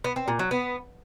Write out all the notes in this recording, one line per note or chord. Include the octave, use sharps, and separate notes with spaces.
B3
C4
A#2
F#3
B3